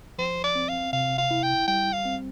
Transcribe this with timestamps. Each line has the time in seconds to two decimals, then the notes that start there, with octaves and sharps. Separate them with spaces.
0.18 F3 C5
0.44 D5
0.55 C4
0.69 F5
0.93 C3 F5
1.18 F5
1.31 E4
1.43 G5
1.68 G3 G5
1.93 F5
2.05 C4